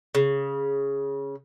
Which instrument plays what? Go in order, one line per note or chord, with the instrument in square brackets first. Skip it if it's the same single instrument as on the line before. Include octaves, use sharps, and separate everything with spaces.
[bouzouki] C#3